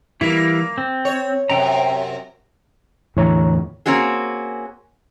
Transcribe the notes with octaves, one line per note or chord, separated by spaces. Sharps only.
E3 G3 A#3 E4
C4
C#5
F#2 C3 G5 A#5
E2 A2 D3 E3 C#5 A#5
A#3 C4 C#4 F#4 G#4